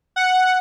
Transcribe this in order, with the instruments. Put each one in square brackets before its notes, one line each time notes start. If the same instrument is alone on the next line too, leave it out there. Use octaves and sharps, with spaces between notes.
[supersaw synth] F#5